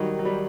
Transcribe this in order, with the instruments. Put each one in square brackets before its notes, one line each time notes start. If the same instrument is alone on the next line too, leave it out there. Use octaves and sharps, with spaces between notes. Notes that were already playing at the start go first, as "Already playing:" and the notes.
Already playing: [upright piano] D#3 G3 D#4 [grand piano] F#3
[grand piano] F#3
G3